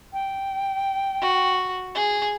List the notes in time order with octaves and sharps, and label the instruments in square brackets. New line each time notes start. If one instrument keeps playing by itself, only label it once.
[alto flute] G5
[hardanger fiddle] F#4
G#4